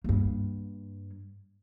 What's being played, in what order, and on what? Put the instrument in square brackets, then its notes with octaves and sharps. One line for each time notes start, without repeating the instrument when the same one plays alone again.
[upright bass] G2 A#3